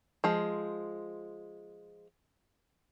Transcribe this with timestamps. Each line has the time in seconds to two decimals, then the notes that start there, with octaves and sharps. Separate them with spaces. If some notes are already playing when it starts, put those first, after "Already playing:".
0.24 F3 G#3